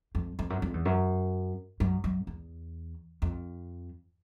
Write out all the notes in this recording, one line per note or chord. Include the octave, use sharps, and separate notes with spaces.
F2
F2
F#2
F2
E2
F#2
F#2
F#2
E2
F2